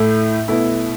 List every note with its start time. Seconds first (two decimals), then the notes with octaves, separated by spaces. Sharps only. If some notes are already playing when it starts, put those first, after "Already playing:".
Already playing: A2 A3 E4
0.48 B2 A3 E4